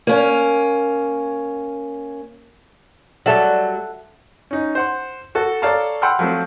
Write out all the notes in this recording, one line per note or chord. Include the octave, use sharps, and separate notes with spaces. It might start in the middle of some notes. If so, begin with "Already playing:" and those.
A#3 C#4
F#3 G3 A4 E5 F#5
C#4 D#4
C5 F#5 C6
F#4 A4
A4 C#5 D5 F5 A5 A#5
F#5 G5 B5 C6 E6 F6
F3 F#3 A3 C4